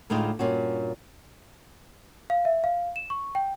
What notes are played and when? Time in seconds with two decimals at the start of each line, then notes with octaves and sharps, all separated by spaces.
0.10 D2 A2 G#3 D4 D#4 F4
0.39 G2 A#2 C#4 F#4
2.30 F5
2.45 E5
2.64 F5
2.96 E7
3.10 C#6
3.35 G5